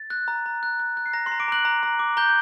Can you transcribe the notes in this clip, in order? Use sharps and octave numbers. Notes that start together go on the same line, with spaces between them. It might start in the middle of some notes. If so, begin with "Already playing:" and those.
Already playing: A6
F#6
A#5
A#5
F#6
F#6
F#6
C7
A#5 A#6
C6 C7
A#5
D6 D7
A#5 F#6 F#7
A#5
A#5
D6
A#5 G6 G7